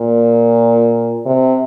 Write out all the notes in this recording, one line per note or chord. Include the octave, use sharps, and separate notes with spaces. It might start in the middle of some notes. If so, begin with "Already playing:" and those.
Already playing: A#2
C3